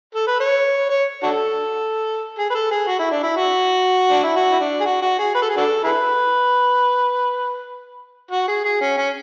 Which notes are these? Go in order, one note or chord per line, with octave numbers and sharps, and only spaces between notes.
A4
B4
C#5
C#5
D4 F#4 A4
G#4
B4
A4
G#4
F#4
E4
D4
E4
F#4
D4
E4
F#4
E4
D4
G#4
F#4
F#4
G#4
B4
A4
G#4
D4 F#4 A4
E4 G#4 B4
F#4
G#4
G#4
C#4
C#4